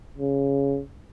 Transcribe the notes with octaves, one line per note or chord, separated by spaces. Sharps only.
C#3